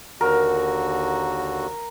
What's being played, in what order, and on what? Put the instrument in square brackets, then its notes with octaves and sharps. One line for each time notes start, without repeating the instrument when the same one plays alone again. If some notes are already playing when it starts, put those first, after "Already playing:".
[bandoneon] D#2 D3 F#4 [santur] A#4